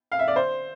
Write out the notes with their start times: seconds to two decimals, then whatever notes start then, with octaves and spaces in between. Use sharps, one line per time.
0.12 F5
0.19 E5
0.28 D5
0.36 C5